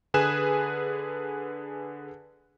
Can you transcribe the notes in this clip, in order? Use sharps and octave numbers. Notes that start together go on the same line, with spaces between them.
D3 G#4 B4 G#5 F#6 E7